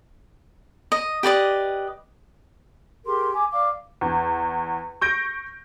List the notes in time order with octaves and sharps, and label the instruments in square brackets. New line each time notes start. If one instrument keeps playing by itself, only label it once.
[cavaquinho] D#5
G4 B4 D5 D#5
[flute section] G4 G#4 A#4 C6
G#5 D6
D5 F5 D6
[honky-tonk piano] E2
C#6 G6 A#6 D7